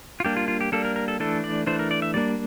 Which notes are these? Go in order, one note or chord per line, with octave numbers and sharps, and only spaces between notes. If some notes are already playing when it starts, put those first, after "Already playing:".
F4
G3 A#3 D4 G4
F4
F4
G4
G3 A#3 D4 A4
A#4
A#4
A4
E3 A3 D4 A4
D5
E3 A3 D4 C5
A#4
D5
E5
G3 A#3 D4 D5